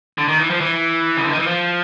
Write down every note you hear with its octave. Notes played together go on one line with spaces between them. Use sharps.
D3
D#3
E3
F3
E3
C#3
D3
D#3
E3
F3